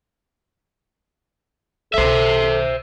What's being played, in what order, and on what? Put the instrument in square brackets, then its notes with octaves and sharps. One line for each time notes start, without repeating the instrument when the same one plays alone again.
[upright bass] B1 D#3 [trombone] A4 [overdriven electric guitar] C5 E5